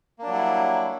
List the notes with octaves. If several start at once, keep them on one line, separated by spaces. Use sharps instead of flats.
F#3 G3 A#3 D4 E4